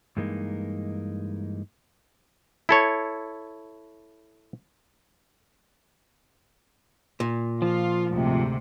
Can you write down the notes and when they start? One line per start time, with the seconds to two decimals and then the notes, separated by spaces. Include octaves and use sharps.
0.17 G2 E3 G#3 A#3 D#4
2.69 E4 A4 C#5
7.20 A#2
7.62 F3 F4
8.10 D2 G#2 C3